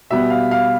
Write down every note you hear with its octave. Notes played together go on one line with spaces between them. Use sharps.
B2 G3 B3 E5
F5
F5